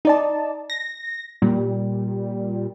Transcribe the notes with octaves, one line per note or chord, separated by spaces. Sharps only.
D#4 D5 A5
A#6
A#2 G3